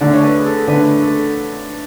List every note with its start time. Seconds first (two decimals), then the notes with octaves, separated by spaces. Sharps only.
0.01 D3 A3 D4 D5
0.13 C#5
0.23 B4
0.37 G#4
0.46 A4
0.68 D3 A3 D4 B4
1.02 A4